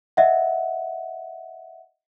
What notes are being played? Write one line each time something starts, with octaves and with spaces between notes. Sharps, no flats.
D#5 E5 F#5